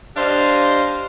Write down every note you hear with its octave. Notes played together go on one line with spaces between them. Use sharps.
D4 G4 C5 D#5 F5